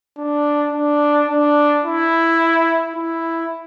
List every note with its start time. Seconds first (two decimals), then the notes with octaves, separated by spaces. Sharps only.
0.18 D4
0.73 D4
1.29 D4
1.85 E4
2.96 E4